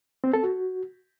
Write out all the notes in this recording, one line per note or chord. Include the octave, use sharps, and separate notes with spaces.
C4
A4
F#4